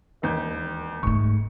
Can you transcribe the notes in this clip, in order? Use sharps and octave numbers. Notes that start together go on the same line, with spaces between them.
E1 D#2 G6
G#2 A3 C#6